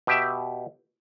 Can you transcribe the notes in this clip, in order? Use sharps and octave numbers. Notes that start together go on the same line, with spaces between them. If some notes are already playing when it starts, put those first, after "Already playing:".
B2 G4 E5